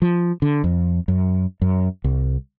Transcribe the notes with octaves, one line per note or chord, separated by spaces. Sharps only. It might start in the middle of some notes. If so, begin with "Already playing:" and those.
F3
D3
F2
F#2
F#2
C2